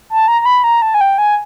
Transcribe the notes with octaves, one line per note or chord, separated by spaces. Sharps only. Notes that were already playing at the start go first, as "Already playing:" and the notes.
A5
A#5
A#5
B5
A#5
A5
G#5
G5
G#5